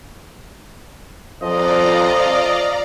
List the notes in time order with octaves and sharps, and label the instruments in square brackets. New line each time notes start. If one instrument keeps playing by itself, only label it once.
[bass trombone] F2 [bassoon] F3 [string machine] D5 F5 A#5 [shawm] D#5